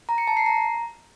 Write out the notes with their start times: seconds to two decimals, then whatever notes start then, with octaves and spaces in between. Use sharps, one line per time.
0.09 A#5
0.18 C#7
0.27 A5
0.37 C7
0.46 A#5